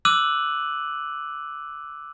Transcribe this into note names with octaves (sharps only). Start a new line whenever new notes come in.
D6 E6 F#6 D#7 F#7